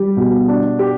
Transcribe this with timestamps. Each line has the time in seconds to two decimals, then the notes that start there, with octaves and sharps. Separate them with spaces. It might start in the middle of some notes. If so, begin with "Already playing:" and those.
Already playing: G3 G4
0.17 B2
0.48 D4
0.79 G4